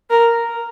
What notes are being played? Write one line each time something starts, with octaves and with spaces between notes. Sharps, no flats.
A#4